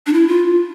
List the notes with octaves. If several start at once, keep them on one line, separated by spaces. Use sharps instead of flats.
D4
E4
F4